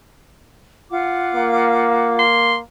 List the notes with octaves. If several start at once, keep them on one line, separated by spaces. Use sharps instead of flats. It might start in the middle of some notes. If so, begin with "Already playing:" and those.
F4 F#5 D6
A#3
C6